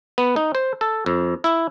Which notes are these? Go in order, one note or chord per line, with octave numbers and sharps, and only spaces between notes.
B3
D#4
C5
A4
F2
E4